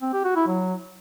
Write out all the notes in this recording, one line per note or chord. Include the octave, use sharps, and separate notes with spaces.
C4
G4
F#4
E4
F#3